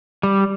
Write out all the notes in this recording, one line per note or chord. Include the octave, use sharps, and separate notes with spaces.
G3